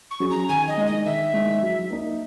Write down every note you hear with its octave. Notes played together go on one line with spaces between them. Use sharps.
C#6
F#3 C#4 G#4
A#5
D#3 G#5
D#5
G#3 D#4
D#5
D#3 E5
G#3 D#4
F#3
A#3 D#4